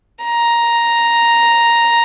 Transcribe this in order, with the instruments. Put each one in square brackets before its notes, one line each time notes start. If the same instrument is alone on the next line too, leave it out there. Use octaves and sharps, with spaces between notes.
[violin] A#5